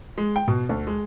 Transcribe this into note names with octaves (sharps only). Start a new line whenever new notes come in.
G#3
G5
B2
D2
G#3